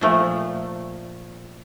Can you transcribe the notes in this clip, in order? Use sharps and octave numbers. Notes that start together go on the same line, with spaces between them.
A#2 F3 A3